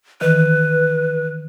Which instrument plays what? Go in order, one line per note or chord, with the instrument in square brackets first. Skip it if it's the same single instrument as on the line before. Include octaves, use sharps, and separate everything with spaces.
[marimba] D#3 E3 [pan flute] B4